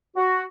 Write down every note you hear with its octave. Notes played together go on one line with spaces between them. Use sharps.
F#4